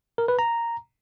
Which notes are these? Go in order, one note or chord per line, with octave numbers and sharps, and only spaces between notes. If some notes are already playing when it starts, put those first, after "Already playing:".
A#4
B4
A#5